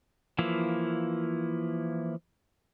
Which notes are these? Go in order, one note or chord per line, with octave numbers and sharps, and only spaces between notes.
E3 F3 A#3 E4